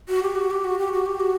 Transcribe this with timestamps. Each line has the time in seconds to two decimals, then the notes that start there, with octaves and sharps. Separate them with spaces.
0.09 F#4
0.23 G4
0.36 F#4
0.51 G4
0.64 F#4
0.79 G4
0.92 F#4
1.06 G4
1.20 F#4